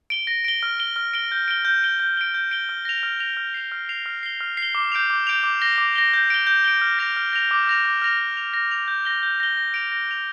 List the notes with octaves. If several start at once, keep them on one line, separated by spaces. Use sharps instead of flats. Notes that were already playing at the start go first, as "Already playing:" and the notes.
D7 G7
A#6
D7 G7
F6
D7 G7
F6
D7 G7
G6
D7 G7
G6
D7 G7
G6
D7 G7
G6
D7 G7
F6
A#6 F7
F6
A#6 F7
F6
C7 F7
F6
C7 F7
F6
C7 G7
F6
C7
G7
D6
G6 D7 F7
D6
G6 D7 F7
D6
A#6 G7
D6
A#6 G7
G6
D7 G7
G6
D7 G7
F6
A#6 F7
F6
A#6 F7
D6
F6 A#6 F7
D6
F6 A#6 F7
A#6
F7
A#6
F7
G6
A#6 G7
G6
A#6 G7
A#6
D7 F7
A#6
D7 F7